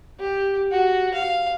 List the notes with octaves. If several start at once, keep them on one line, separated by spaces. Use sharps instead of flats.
G4
F#4
F5